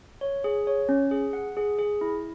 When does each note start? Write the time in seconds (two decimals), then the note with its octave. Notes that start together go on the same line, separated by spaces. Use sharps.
0.21 C#5
0.44 G#4
0.67 C#5
0.89 C#4
1.11 G#4
1.33 F#5
1.57 G#4
1.79 G#4
2.01 E4